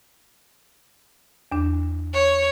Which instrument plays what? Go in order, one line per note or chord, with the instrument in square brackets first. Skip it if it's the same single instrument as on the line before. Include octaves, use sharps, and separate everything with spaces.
[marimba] E2 D4
[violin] C#5